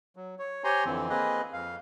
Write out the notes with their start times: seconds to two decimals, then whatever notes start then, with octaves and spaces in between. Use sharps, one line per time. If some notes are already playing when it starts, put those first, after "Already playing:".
0.16 F#3
0.39 C#5
0.64 G4 C5 C#5 G#5 A#5 C6
0.85 F2 D3 E3 C4
1.10 A#3 C4 G#4 B4 D#5
1.53 F2 F5